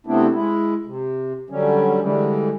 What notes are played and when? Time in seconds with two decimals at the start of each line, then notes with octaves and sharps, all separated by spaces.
0.07 C3 A3 B3 C4 D4 E4
0.35 G#3 E4
0.86 C3
1.50 D3 F#3 G3 C#4
2.01 D3 E3 G3 G#3